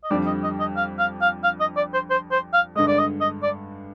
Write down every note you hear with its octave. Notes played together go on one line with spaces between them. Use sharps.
D#5
F2 D3 G3 D4 D5
D#5
D#5
D#5
F5
F5
F5
F5
D#5
D5
C5
C5
C5
F5
G2 D3 G#3 D#5
D5
D#5
D#5
D5